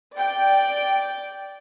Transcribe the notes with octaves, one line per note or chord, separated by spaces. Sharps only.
D5 G5